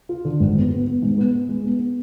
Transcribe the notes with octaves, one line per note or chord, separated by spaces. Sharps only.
F4
D3
G#1
B3
B3
B3
G#2
B3
B3
G#3
B3
B3